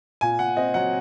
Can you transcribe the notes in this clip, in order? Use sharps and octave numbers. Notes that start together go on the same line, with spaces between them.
A#2 G#5
A#2 F#5
C4 D#5
F#3 F#5